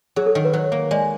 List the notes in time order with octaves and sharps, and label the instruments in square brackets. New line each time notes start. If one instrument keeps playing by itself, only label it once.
[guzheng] F#3 [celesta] G#4
[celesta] A4
[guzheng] D#3
[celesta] B4
[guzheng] F#3 [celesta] C#5
[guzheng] A#3
[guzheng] G#3 [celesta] D5